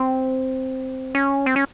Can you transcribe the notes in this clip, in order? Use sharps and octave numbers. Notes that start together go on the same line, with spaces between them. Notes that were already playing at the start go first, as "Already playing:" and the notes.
Already playing: C4
C#4
C4
C#4